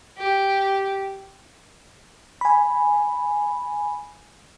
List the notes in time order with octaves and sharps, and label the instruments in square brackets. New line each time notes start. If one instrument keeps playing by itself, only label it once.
[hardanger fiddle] G4
[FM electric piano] G#5 B5